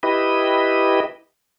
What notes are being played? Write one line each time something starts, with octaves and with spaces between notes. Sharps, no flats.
E4 G4 B4 D#5